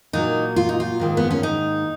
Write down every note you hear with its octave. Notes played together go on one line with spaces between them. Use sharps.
A#2 F#3 A#3 D#4
F4
D#4
F4
G#2 D#3 A#3
B3
C#4
D#4